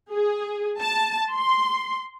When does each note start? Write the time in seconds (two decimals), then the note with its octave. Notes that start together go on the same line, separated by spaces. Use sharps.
0.11 G#4
0.80 A5
1.32 C6